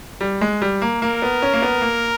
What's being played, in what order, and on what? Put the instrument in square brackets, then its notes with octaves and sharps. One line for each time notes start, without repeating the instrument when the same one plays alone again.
[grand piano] G3
G#3
G3
A#3
[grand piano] A#3 [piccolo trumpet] A#4
[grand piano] B3
C#4
A#3
B3
A#3